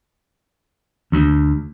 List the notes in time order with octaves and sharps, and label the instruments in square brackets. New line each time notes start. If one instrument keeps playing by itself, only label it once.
[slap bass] D2